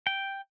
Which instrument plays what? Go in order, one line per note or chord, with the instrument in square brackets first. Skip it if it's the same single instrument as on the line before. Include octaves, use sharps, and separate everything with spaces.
[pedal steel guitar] G5